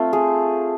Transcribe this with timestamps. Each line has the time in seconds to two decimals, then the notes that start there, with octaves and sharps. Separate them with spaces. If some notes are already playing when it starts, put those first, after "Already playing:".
Already playing: A3 C4 F4
0.13 G#4